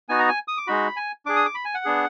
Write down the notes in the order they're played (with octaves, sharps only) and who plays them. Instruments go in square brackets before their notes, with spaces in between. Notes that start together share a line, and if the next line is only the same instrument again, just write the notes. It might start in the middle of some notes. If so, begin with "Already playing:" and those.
[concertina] B3 D#4 F#4 G#5
A#5
G#5
D#6
D6
G#3 D#4 F#4 B5
G#5
D4 G#4 D6
D#6
D6
B5
G#5
F#5
B3 D4 G#4